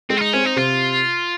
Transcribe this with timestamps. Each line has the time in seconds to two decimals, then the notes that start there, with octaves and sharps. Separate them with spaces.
0.10 G#3 C4
0.17 F4
0.22 D#4
0.33 C4 C#4
0.45 D#4
0.56 C3 F4